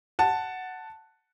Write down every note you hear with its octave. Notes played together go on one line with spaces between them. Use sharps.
F#5 A5